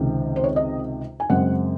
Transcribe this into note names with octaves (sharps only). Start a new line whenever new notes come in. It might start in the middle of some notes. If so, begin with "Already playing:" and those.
Already playing: C#2 C3 D#3
C5
C#5
D#5
G#5
F#2 C#3 G#3 C4 F#5